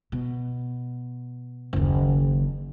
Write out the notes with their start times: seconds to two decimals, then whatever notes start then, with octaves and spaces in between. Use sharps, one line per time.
0.12 B2
1.73 F#1 D#2